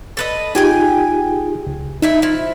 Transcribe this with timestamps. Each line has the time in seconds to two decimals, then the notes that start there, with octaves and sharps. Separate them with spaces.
0.17 A4 B4 D#5
0.55 D#4 F4 G4 G#4 G5 G#5
1.67 C#2
2.02 A3 D#4 E4 E5
2.22 F3 E4